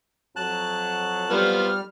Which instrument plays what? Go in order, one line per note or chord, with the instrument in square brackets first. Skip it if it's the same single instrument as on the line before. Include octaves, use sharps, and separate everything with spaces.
[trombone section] F2 F#3 [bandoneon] A5 F#6
[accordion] G3 F6 [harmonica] B3 F4 C5